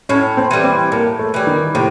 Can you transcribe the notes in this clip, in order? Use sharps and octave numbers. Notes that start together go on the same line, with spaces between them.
A2 C#4
C4
E3 G3
C4
A2 A#3
A3
E3 G3
D#3
A2 C3